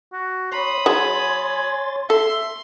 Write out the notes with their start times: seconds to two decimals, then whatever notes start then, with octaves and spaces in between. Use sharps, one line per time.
0.13 F#4
0.52 C#5 B5 C6 D#6
0.86 F#3 G#4 C#5 G#5 C6 A6
2.10 A4 E5 C6